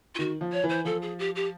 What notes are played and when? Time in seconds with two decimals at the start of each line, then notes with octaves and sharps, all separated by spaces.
0.15 F4
0.19 D#3 F#4
0.41 F3
0.52 C#5
0.64 E3
0.69 C5
0.85 F3 A4
1.02 G#4
1.19 G4
1.35 G4